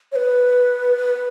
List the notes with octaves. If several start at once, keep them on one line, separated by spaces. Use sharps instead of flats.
C#5
B4